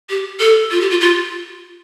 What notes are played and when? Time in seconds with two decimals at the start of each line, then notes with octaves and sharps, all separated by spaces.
0.10 G4
0.40 A4
0.71 F4
0.81 G4
0.90 F4
1.01 F4